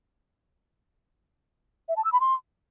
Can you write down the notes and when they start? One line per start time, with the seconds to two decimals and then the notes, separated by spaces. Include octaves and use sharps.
1.89 E5
1.97 A5
2.04 E6
2.12 B5
2.20 C6